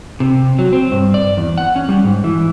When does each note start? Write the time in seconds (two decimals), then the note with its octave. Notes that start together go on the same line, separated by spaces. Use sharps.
0.20 C3
0.59 F#3
0.73 C4
0.92 G2
1.14 D5
1.37 E2
1.58 F#5
1.76 C#4
1.89 G3
2.04 G#2
2.24 E3